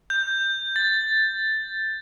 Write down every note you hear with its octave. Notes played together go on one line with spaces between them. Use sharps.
G6
A6